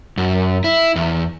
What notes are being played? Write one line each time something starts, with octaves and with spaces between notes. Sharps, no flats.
F#2
E4
E2